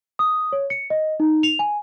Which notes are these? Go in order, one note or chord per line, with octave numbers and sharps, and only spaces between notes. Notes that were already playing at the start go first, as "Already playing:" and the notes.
D#6
C#5
C#7
D#5
D#4
F7
G#5